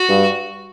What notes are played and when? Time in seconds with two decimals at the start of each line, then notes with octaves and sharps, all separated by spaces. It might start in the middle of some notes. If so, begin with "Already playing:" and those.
Already playing: F#4
0.09 G2